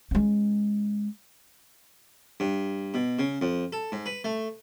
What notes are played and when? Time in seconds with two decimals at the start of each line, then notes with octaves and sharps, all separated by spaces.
0.11 G#3 C#4
2.40 G2
2.94 B2
3.19 C#3
3.41 F2
3.73 A4
3.92 G#2
4.06 B4
4.24 A3